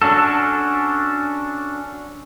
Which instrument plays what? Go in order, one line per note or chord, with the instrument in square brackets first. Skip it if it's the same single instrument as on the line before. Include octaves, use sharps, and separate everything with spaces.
[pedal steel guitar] C#4 D4 F#4 A4